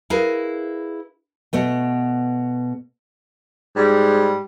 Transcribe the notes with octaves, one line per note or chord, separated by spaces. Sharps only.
E4 G#4 A#4 B4 F5
B2 A3 B3
G#2 G3